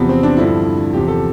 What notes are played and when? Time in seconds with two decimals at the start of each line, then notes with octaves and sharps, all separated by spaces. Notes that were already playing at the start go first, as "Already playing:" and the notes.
Already playing: E2 C3 F3 B3
0.09 C4
0.23 D4
0.37 G2 D3 F3 E4
0.93 E2 C3 F3 G4
1.08 A4